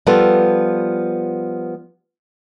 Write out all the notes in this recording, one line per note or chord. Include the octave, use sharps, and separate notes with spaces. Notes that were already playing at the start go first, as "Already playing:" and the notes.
F3 G3 B3 F4 A4